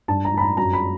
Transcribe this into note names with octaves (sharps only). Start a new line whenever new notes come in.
G2 A5
A#5
G2 B5
A#5
F#2 A#5
B5